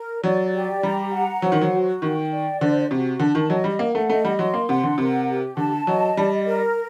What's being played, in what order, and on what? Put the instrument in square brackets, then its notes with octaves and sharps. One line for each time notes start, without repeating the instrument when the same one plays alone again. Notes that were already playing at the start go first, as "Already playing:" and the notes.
Already playing: [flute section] A#4
[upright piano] F#3 [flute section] D5
[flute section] G4
[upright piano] G3 [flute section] A#5
[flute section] F#5
[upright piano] F#3 [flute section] C5
[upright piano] D#3
F#3
[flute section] F#4
[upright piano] D#3 [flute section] G5
[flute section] D5
[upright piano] D3 [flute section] C5
[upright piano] C3 [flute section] F#4
[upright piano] D3 [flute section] A5
[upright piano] D#3
[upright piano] F#3 [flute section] D#5
[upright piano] G3
[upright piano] A#3 [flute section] F#5
[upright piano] A3
[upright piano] A3 [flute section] D#5
[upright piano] G3
[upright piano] F#3 [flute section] C6
[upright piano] A#3
[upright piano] C3 [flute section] F#5
[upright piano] D3
[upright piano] C3 [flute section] A#4
[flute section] G4
[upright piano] D3 [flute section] A5
[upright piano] F#3 [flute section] D#5
[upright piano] G3 [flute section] D5
[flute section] A#4